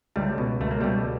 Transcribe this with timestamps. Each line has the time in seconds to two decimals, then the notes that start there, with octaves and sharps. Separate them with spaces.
0.16 C#2 G3 A3
0.38 B2
0.61 C#2 A3
0.71 A#3
0.81 B2 G3 A3